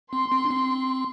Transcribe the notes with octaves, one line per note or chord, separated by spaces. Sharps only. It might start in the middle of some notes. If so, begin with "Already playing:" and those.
C4 C6
C4
D4
C4